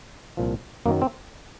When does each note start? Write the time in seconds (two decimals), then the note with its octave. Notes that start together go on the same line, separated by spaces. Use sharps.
0.37 C2 A#2 F3
0.86 F#2 D#3 F#3 A#3
1.02 C4